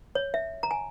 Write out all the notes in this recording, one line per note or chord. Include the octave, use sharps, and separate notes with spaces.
C#5
E5
A#5
G#5